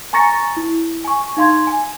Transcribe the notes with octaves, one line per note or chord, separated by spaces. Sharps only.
G#5 A#5 C#6 A6 A#6 C#7
E4
G#5 C#6
D#4 F5 C6 G#6
G#5